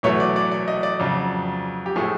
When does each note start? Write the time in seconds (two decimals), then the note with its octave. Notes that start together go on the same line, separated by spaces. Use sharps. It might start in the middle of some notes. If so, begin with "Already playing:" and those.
0.03 E2 B2 F#3 A3 C#5
0.20 D5
0.36 D5
0.51 D5
0.68 D#5
0.83 D5
1.00 F2 C#3 F#3
1.86 G4
1.96 A2 F3 A3 G#4